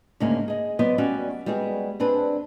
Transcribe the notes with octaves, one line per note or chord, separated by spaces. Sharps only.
D2 G#2 C#3 A#3 D#4 G#5
G#4 D#5
F#3 B3 C5 D5 D#5
G3 C#4 F#4 D5
G3 G#3 B3 F#4 G#4
C4 D4 G#4 B4